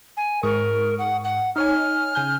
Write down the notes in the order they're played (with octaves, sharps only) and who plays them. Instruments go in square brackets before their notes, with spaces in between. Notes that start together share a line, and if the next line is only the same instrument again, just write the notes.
[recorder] G#5
[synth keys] G#2 C#6 D#6 [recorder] A#4
[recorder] F#5
F#5
[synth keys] D#4 C#5 G#5 [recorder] F6
[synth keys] C#3 G#5 G6